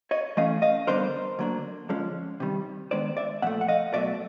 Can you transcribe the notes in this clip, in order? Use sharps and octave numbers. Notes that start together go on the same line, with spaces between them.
C#5 D#5
E3 A3 C#4 D#5 F5
D#5 F5
D3 G3 B3 D4 A#4 C5
D3 F#3 A#3 D4
D3 F3 G#3 C#4
C3 D#3 G3
D#3 G#3 B3 D4 C5 D5
D5 E5
A#2 F3 A3 E5 F#5
F#5
D#5 F5
B2 F#3 A3 D5 E5